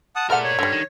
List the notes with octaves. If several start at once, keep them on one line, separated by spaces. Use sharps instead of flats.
F#5 A5 D#6
G#3 A3 A#4 D5 F#5 F6
C#5
G2 D3 G3
D#3